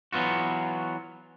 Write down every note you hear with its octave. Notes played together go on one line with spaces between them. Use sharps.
E3 F#3 B3 F4 F#4